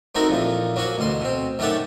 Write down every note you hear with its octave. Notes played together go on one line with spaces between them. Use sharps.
A3 C4 D#4 F#4 A4 A#4
F2 A#2 E3
F#3 A#3 C#4 F#4
A1 D2 B2 C6
B2 C4
F#2 D#3 A3 G4 F#5 A5